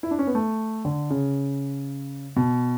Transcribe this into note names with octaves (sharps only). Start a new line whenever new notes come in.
E4
D4
C#4
B3
A3
D3
C#3
B2